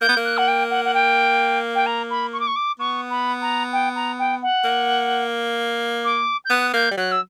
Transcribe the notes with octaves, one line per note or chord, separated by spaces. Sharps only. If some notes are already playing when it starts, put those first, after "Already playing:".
A#3 G6
B3
A#3
F#6
F#5
G5
F#5
F#5
G5
G5
A#5
B5
C#6
D6
C#6
D6
B3 C#6
B5
A#5
G5
A#5
G5
F#5
A#3
D6
G6
B3 F#6
A#3 G6
G3
F#3 F#6
E6